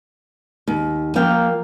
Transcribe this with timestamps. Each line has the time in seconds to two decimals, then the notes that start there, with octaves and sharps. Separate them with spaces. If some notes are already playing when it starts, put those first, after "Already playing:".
0.68 D#2
1.16 F3 A#3 F5 G5